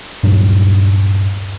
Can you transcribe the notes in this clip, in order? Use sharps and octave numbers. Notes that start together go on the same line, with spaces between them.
D1 G2 A#2 F#3